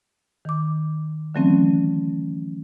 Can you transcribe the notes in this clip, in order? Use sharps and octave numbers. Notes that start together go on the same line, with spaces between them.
D#3 D6
D3 E3 F#3 A3 C4 C#4